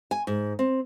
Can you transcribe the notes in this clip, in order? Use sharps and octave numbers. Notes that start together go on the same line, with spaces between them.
G#5
G#2
C4